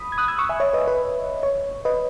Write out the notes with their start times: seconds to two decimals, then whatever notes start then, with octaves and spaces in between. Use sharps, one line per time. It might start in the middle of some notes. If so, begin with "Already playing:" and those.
Already playing: B5 D#6
0.12 G#6
0.18 D#6 F#6
0.28 E6 G#6
0.39 C#6 E6
0.49 E5 G#5
0.60 C#5 E5
0.73 B4 D#5
0.88 B4
1.43 C#5
1.85 B4 D#5